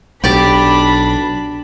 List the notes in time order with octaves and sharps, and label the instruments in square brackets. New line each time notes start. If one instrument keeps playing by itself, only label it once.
[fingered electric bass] B1 [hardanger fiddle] D4 [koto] G4 D5 [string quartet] B5